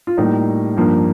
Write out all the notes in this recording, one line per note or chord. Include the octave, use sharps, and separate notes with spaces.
F4
A2 G3 A#3 D#4
G2 F3 A#3